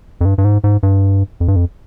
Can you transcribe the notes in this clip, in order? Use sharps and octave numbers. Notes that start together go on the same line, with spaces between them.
F2
G2
G2
G#2
G#2
G2
F2
G2
F2